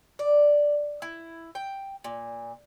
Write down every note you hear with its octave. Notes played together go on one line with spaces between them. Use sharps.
D5
E4
G5
A#2